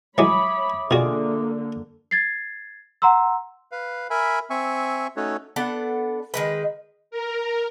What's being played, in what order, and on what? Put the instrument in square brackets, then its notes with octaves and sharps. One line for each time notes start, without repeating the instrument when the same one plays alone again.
[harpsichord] E3 F#3 G#3 [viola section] C#5 B5 [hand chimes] E5 D6 D#6
[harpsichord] B2 F#4 [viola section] D3 A#3 [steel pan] F4 G#4 D5
[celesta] G#6 A6 C7
F#5 A#5 C6 E6
[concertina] B4 F5
A#4 E5 G#5 B5
C4 E5 G#5 C#6
A3 C#4 D#4 F#4 A4 C#5
[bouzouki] B3 D4 A4 F#5
D#3 G#3 B4
[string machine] A#4